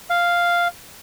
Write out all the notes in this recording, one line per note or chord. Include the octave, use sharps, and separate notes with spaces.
F5